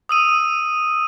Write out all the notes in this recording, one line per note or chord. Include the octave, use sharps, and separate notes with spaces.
D#6 E6 D#7